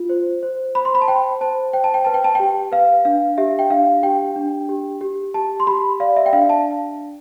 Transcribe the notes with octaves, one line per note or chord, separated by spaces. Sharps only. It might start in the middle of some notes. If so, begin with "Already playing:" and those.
Already playing: F4
C5
C5
C5 B5
C6
B5
A5
C5 G5
C5 A5
C5 G5
A5
G5
B4 A5
G5
A5
G4 G5
B4 F5
D4 F5
G4 E5
G5
D4 F5
G4 G5
D4
G4
G4
G4 A5
C6
G4 B5
D5 F5
E5
G5
D4 F5
A5